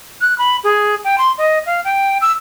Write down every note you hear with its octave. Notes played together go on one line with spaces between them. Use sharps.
F#6
B5
G#4
G5
C6
D#5
F5
G5
E6